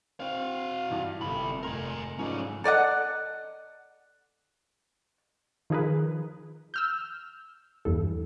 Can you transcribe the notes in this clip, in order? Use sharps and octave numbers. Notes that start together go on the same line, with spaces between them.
C4 F#4 F5
G2 E3
G1 C3 B5 C6
F1 A#4 G#5 C6
G#2 D3 F3 C#4
A4 D5 D#5 F#5
D#3 F3 G#4 A#4 B4
E6 F6 G6
E2 G2 A4